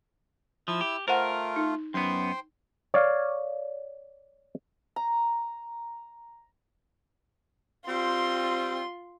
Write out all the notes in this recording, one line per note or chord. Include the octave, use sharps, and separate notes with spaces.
F3 E4 E6
G4
A3 F4 A#4 C5 F#5
D#4
F#2 B3 C5 G5 C6
C#5 D5 F5
A#5
G3 C4 F4 C6